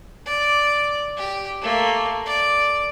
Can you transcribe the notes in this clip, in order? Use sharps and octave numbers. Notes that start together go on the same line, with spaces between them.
D5
G4
A3 A#3
D5